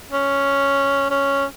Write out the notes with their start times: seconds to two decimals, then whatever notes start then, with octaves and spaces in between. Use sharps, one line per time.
0.12 C#4
1.10 C#4